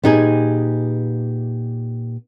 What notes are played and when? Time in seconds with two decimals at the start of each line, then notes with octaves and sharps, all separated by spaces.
0.04 A#2 B3 D#4 G4 G#4 G#5